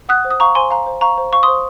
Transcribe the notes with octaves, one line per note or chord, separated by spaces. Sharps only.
F#5 D#6 F#6
C5
D#6
F5 A#5 C#6
C5 G#5 C6
F5 A#5
C5
F5 A#5 C#6
C5
F5 C#6
C6 D#6
C5